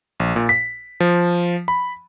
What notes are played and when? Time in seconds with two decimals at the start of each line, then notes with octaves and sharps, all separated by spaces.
0.20 A#1
0.36 A#2
0.49 B6
1.00 F3
1.68 B5